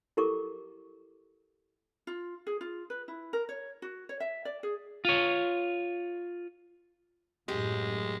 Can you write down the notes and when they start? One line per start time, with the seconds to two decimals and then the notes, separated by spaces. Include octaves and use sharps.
0.17 E4 G4 A4 A#4 C#6 D6
2.07 F4
2.47 G#4
2.61 F4
2.90 B4
3.08 E4
3.33 A#4
3.49 C#5
3.82 F#4
4.09 C#5
4.20 E5
4.45 D5
4.63 G#4
5.05 F4 C#5
7.48 F#2 A2 G#3 G4